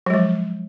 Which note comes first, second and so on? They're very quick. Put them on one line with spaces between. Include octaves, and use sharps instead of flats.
F#3 G#3 F3